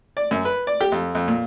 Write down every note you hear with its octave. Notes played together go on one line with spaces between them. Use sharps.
D5
F#2
B4
D5
G4
F2
F2
A#2